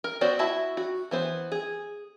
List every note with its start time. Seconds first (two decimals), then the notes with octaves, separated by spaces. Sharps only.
0.04 A#4
0.21 B3 F#4 C5 D5
0.39 E4 F#4 E5 A5
0.77 F#4
1.11 E3 B3 C5
1.52 G#4